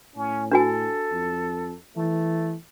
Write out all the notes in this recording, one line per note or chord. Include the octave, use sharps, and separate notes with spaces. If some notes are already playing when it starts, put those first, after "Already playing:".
A2 C#4
D4 F#4 A4 G#5
F2
E3 A3